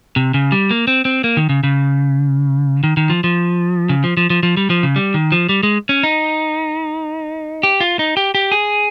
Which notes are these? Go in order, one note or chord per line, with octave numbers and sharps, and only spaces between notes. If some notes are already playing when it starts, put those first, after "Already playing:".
C3
C#3
G3
A#3
C4
C4
A#3
D#3
C#3
C#3
D#3
D#3
F3
F3
C#3
F3
F3
F3
F3
G3
F3
C#3
G3
D#3
F3
G3
G#3
C#4
D#4
G4
F4
D#4
G4
G4
G#4